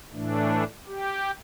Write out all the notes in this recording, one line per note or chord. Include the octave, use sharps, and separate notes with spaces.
A2 E3 A3 D4
G4